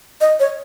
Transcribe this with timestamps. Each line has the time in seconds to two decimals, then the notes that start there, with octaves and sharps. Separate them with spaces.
0.21 D#5
0.40 C#5